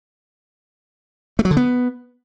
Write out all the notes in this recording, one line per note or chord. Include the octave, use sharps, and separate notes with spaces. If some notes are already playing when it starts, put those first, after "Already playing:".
A3
F#3
D3
B3